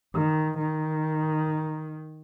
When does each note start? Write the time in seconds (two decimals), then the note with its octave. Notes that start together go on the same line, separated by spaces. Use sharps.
0.13 D#3
0.58 D#3